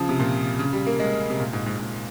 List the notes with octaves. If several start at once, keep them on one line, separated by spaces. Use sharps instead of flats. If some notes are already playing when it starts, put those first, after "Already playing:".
Already playing: C#3 F3
C3
A#2
C#3
G3
A#3
G#3
C3
A#2
G#2
G#2
G#2